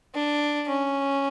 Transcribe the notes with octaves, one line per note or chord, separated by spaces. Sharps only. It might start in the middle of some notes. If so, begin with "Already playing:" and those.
D4
C#4